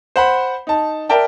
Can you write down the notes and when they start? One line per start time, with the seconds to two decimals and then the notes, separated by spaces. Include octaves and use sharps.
0.16 C5 F#5 B5
0.67 D#4 A5
1.09 A#4 D5 E5 G5 A5